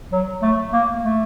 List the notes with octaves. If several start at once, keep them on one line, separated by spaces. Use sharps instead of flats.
F#3
A3
A#3
A3